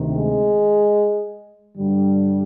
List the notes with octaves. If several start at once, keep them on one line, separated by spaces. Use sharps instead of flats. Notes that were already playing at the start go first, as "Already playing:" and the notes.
Already playing: D2 C3 D#3
G#3
G2 D3 G3